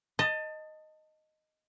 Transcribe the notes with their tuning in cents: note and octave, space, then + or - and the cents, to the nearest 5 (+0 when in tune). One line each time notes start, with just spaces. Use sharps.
D#5 +0 A5 +25